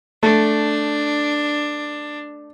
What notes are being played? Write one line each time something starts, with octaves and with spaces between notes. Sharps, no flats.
A3 D4